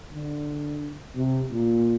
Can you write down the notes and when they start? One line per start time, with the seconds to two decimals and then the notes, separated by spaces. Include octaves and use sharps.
0.13 D3
1.16 C3
1.51 A#2